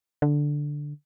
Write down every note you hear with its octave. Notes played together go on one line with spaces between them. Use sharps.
D3